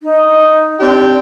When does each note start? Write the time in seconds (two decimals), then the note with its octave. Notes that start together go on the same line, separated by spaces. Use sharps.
0.03 D#4
0.80 C4 D4 G4